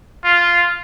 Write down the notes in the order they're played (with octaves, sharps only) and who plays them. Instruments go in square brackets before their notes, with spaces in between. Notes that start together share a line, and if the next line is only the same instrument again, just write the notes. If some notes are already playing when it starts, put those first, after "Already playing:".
[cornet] F4